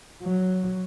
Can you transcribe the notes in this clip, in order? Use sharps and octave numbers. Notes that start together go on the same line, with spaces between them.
F#3